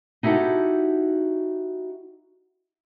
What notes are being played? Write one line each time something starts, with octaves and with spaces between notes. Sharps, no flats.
D#4 E4 F#4 G4 A4